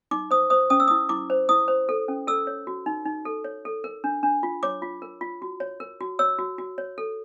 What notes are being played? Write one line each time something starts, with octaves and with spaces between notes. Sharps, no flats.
D#4 D6
C5 D#6
C5 D#6
C#4 D#6
E6
E4 D#6
E4 D6
C5
E4 D#6
C5
A4
C#4
A4 E6
C#5
F#4
D#4
D#4
A4
C#5
A4
A#4
D4
D4
F4
C#5 D6
F4
A#4
F4
F#4
C#5
A#4
F#4
C#5 E6
F#4
F#4
C#5
A4